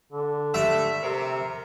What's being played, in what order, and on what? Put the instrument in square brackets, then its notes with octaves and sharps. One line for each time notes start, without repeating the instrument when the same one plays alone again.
[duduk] D3
[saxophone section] G2 G3 A3 [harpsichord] E5
[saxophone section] C3 [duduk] A#4